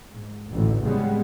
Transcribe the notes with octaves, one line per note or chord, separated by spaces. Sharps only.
G#2
A1 D2
C#3 G3 G#3 B3